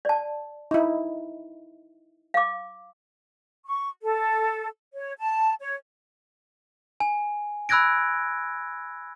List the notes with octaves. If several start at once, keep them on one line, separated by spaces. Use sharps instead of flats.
D5 A5
D#4 E4
F5 D6
C#6
A4
C#5
A5
C#5
G#5
B5 E6 F#6 G#6 A#6 D7